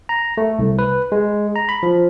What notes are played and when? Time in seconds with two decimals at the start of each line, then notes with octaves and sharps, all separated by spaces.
0.09 A#5
0.37 A3
0.59 C2
0.79 B4
1.12 G#3
1.56 A#5
1.69 B5
1.83 F3